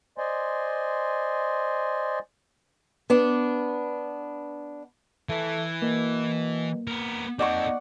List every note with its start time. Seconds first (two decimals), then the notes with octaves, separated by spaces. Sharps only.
0.18 C5 D5 D#5 G#5 C6
3.10 B3 D4
5.29 E3 A3
5.82 B2 A#3
6.87 B3 A#4
7.39 C4 D#4 A4 D5 F#5 C#6